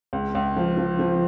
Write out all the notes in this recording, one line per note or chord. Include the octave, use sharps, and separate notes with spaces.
C#2
C#2
F3
F3
F3